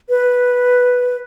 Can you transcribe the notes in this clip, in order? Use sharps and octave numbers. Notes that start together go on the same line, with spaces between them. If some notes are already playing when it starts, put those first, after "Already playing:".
B4